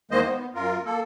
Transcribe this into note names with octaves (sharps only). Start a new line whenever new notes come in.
E2 D#3 G#3 A#3 C5 D#5
B3
F#2 F4 A#4
A#3 A4